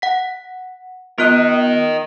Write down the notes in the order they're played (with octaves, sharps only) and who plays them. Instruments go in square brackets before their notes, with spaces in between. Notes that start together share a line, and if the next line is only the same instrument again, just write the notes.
[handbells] F#5 B6
[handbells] B3 F4 F#6 [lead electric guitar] A#4 D#5